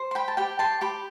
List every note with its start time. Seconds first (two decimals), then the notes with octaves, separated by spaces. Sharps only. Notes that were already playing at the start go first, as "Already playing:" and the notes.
Already playing: C5
0.11 C6
0.15 G5 B5
0.28 A5
0.37 G4 G5 B5
0.59 A5 C6
0.81 G4 B5 D6